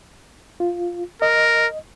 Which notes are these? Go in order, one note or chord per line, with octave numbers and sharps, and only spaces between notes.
F4
A#4 D#5